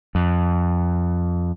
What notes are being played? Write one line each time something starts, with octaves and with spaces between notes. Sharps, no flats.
F2